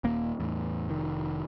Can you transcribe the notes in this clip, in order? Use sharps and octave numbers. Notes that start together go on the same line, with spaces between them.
D#1 D#2 A#3
E2 A2
F1 D#3